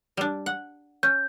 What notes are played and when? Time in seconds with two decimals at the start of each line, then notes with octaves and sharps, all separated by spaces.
0.17 G3 D4
0.46 F#5
1.03 C#4 G6